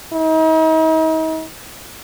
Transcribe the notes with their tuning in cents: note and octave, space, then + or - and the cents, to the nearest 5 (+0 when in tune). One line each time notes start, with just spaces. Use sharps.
D#4 +40